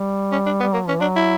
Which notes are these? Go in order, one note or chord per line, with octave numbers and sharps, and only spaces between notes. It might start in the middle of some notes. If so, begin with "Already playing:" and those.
Already playing: G3
C#4
D4
G3 B3
F#3 A#3
E3 C#4
F#3 D4
E4